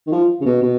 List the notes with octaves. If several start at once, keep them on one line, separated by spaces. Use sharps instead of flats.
D#3
F3
C#3
B2
B2